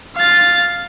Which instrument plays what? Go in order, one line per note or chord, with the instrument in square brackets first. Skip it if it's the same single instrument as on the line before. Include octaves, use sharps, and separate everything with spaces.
[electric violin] F5 A6